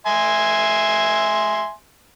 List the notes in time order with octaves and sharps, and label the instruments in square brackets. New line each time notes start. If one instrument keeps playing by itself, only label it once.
[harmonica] E5 G#5 C6